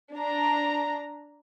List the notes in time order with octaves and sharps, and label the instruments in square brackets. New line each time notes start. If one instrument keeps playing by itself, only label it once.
[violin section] D4 A#5